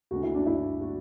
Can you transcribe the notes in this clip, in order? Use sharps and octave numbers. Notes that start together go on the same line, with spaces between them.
D2 D3 F#4
E4
D4
E4
F#4